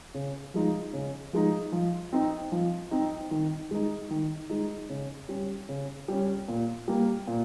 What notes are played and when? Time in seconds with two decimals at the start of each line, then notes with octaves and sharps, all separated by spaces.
0.14 C#3
0.54 F3 G#3 D#4
0.93 C#3
1.33 F3 G#3 D#4
1.72 F3
2.13 C4 D#4
2.52 F3
2.91 C4 D#4
3.31 D#3
3.71 G#3 D#4
4.11 D#3
4.50 G#3 D#4
4.89 C#3
5.29 G3 C#4
5.69 C#3
6.08 G3 C#4
6.48 A#2
6.88 G3 A#3
7.27 A#2